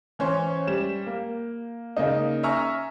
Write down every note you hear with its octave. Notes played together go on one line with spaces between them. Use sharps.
E3 C#4 C5 C#5
G3 E7
A#3
C#3 A#3 D#4
E5 G#5 A#5 C#6 E6 F6